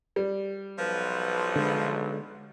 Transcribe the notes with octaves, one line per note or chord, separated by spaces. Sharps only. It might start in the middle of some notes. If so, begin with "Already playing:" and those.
G3
B1 F3 B4
D3 G#3